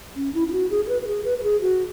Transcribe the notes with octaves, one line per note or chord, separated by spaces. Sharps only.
C#4
E4
E4
F#4
G#4
G#4
B4
B4
G#4
B4
B4
G#4
F#4